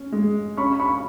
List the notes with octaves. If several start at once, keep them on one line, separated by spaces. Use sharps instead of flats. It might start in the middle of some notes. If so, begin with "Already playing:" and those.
Already playing: C#4
G#3
C#4 B5 C#6
B5 C#6